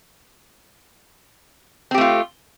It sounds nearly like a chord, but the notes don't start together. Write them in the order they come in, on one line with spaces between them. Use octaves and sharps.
C4 G4 A3 F4